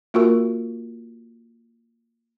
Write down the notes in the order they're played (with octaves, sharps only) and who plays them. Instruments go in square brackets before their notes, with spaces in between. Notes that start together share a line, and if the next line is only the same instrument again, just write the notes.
[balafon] A#3 F4 F#4 A#4